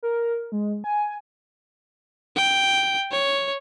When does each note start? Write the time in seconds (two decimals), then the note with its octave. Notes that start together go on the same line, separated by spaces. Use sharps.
0.03 A#4
0.52 G#3
0.84 G#5
2.36 G5
3.11 C#5